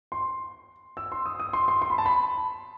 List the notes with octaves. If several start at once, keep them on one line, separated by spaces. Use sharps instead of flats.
C6
E6
C6
D#6
D#6
C6
C6
C6
B5
A5
B5